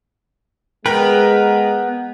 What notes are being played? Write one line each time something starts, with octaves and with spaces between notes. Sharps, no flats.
G#3 B3 A#4 B4 G5 A#5